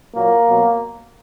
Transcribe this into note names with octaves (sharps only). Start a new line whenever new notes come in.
A#2 F#3 A#3
B2 F#3